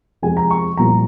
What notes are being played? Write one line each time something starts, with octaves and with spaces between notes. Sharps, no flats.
F2 C3 F3 G#3 G#5
A#5
C#6
C2 A#2 F3 A#5